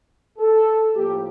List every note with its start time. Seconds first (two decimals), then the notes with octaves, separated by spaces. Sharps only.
0.39 A4
0.94 A2 F3 A#3 G4